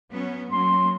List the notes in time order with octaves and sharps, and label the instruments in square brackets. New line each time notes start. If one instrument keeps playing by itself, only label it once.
[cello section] F#3 B3 C#4
[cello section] F#3 A#3 C#4 [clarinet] C6